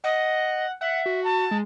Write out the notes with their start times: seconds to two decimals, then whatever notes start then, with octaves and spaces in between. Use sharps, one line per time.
0.04 D#5 F#5
0.81 E5 F#5
1.06 F#4
1.24 A5
1.51 G#3